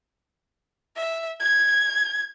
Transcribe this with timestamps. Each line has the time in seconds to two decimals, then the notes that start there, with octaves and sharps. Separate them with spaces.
0.96 E5
1.40 G#6